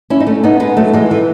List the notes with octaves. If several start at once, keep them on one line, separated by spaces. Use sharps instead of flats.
C#4 E4
D#4
A3 C#4
B3 D#4
G#3 B3
F#3 A3
E3 G#3
E3